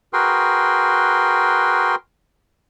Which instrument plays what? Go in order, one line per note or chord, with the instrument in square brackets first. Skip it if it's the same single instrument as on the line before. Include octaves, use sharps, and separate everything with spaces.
[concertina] F#4 G#4 A#4 B4 G5 C6